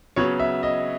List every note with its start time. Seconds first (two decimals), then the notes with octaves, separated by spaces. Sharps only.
0.16 C#3 F#3 B3 C#5
0.40 E5
0.63 D#5